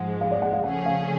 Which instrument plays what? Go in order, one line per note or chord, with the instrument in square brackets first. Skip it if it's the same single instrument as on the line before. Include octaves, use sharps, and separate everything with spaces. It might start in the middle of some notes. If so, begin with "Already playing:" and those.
Already playing: [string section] G#2 F3 G#3 [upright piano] F#5
[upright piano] F5
D5
F#5
F5
[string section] C#3 F3 A3 C#4 G#4 [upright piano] F#5
[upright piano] F5